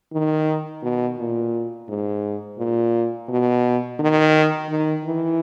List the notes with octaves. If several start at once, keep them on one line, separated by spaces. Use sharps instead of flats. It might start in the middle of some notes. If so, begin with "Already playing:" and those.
D#3
B2
A#2
G#2
A#2
B2
D#3
D#3
E3